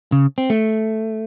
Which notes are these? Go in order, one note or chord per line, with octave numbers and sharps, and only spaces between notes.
C#3
C4
A3